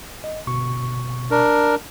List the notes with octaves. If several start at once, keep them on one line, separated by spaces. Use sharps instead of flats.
D#5
G1 B2 C#6
D4 A#4